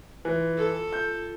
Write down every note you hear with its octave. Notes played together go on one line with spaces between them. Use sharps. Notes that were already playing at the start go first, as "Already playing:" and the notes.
E3 F4
A4
G6